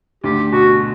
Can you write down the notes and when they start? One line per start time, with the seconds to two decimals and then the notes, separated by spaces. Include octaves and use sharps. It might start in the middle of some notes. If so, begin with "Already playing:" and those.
0.24 D2 D3 G4
0.52 B2 F#4